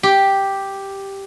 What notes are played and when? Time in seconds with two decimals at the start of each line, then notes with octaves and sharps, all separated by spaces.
0.03 G4